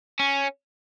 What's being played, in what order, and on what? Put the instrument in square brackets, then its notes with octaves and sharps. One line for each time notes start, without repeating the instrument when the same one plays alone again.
[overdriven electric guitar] C#4